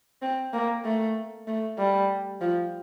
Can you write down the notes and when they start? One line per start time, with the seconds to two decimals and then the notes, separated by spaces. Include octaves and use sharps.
0.22 C4
0.53 A#3
0.85 A3
1.47 A3
1.79 G3
2.41 F3